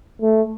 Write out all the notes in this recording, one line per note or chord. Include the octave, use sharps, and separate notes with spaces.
A3